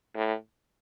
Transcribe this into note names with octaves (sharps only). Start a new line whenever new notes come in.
A2